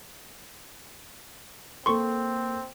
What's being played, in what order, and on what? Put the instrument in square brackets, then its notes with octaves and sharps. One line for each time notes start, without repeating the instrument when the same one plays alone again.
[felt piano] A#3 A4 [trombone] C4 [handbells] C6 C#6